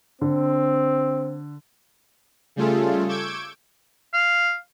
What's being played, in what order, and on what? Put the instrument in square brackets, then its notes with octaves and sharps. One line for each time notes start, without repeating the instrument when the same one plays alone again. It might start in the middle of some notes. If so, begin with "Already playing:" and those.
[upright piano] D3 [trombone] C4
[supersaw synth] C#3 G3 A3 F4 G#4 A4
C#6 D6 E6 G6 G#6 D7
[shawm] F5